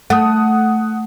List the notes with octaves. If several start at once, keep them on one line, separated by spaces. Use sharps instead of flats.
A3 F#5 D#6